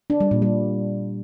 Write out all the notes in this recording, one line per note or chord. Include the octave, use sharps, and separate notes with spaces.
D4
G3
A#2
G3